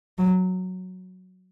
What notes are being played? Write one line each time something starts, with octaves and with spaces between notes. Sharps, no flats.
F#3